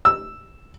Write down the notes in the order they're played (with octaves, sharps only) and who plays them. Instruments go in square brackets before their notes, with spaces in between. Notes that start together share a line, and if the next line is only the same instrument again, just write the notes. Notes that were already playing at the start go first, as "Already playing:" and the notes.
[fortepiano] E6